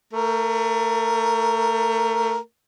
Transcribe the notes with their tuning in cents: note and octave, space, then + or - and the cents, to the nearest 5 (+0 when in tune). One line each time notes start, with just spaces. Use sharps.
A3 +25 A#4 +0